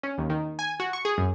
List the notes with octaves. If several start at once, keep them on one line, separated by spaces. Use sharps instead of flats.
C#4
D#2
D#3
G#5
F#4
C#6
G#4
F#2